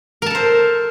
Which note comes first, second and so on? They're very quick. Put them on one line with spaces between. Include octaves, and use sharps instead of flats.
A#4 A5 A4 C5